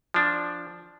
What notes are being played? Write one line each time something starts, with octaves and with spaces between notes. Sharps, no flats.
F3 D4